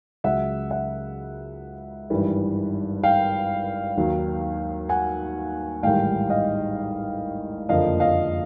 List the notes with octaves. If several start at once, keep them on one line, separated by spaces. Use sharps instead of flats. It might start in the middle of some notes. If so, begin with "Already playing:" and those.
C#2 C#3 F#3 E5 F#5
E5 F#5
G#1 G2 E3 G3
F5 G5
D#2 D#3 F#3
F#5 G#5
A1 G#2 D#3 G3 F5 G5
D#5 F5
F#1 F2 D3 F3 A#3 D#5 F5
D#5 F5